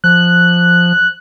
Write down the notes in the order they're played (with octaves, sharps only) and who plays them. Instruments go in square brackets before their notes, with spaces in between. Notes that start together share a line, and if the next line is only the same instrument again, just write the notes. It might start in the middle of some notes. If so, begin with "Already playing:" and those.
[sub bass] F3 [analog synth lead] F#6